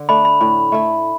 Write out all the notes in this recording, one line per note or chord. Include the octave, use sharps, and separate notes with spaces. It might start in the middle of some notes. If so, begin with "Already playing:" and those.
Already playing: D3
A3 D4 B5
B5
A2
A3 E4